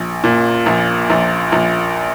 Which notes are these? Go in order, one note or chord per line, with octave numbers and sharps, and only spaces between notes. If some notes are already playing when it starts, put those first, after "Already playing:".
Already playing: A#1
A#2
A#1
A#1
A#1